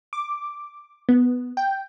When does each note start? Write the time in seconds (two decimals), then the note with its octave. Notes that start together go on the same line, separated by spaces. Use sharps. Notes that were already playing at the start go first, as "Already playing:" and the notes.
0.13 D6
1.09 B3
1.57 G5